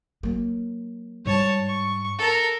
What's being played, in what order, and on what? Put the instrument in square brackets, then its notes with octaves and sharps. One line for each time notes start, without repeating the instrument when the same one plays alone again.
[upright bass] F#3 A#3
[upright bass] G#2 G3 [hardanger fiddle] C#5 A5
[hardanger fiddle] C#6
A4 A#4